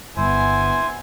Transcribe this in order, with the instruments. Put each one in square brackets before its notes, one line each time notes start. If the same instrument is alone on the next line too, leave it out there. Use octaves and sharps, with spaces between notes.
[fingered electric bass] G1 G2 [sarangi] B3 [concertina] E4 C5 [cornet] G#5